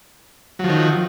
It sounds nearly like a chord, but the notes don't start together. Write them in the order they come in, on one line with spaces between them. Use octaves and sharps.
F#3 F3 D#3